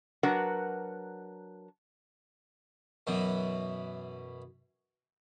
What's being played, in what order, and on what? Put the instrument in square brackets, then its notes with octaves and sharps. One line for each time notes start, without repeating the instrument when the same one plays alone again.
[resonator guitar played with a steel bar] F#3 D4 F#4 A#4 B4 F#5
[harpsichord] F#2 B2 E3